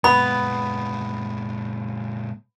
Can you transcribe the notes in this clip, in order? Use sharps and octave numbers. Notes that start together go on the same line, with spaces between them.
A#2 G#3 B3 B5